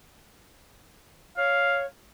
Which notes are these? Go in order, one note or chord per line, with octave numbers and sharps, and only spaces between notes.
C#5 F5